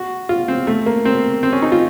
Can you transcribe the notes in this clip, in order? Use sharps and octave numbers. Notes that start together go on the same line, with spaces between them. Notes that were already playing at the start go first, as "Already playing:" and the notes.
Already playing: F#4
F4
C4
A3
A#3
C4
C4
C#4
D#4
F4